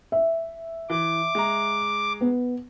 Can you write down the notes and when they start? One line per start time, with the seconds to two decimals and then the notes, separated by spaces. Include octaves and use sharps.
0.12 E5
0.90 E3 D6
1.35 G#3 A#5
2.21 B3